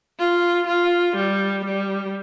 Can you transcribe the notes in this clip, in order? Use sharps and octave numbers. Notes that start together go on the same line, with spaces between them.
F4
F4
G3
G3